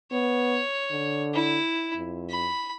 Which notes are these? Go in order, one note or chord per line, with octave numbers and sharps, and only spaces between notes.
B3 C#5
D3
E4
F2
B5